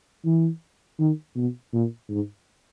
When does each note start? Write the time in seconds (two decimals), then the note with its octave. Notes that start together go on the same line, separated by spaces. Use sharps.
0.25 E3
0.99 D#3
1.36 B2
1.73 A#2
2.10 G#2